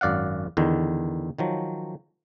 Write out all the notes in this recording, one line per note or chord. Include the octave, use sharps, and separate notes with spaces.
G#1 F#2 D5 F5 F#5
E2 D3 D#3
D#3 F3 F#3